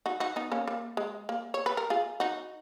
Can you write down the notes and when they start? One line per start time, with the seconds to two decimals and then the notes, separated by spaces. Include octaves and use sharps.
0.06 D#4 F#4
0.20 D#4 F#4
0.36 B3 D#4
0.52 A#3 C#4
0.68 A#3
0.97 G#3
1.29 A#3
1.54 C#5
1.66 B4
1.77 A#4
1.90 F4 G#4
2.20 D#4 F#4